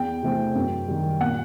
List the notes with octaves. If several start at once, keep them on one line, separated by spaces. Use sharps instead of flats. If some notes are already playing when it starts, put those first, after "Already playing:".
Already playing: E2 G5
C3 E3 A3 C4
F#2
D#3 G3
A#2 F#5